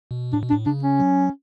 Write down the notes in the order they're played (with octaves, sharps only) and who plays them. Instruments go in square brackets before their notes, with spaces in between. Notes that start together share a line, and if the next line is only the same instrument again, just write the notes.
[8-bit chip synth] B2
[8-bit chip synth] A2 [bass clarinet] D4
[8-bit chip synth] B2
[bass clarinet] D4
[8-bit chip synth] A2
[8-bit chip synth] C#3 [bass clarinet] D4
[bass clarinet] C#4
[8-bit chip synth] F#3